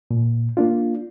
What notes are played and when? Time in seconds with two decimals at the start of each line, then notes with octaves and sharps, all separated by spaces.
0.11 A#2
0.57 A#3 D4 F4